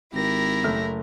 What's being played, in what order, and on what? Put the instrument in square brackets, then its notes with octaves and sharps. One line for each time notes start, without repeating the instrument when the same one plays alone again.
[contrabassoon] G#1 [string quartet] E4 A#4 [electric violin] G4 A#6
[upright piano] F#1 A3 F6